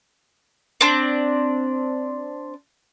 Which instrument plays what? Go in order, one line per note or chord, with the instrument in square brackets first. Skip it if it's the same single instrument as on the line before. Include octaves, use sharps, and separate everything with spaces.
[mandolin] C4 D4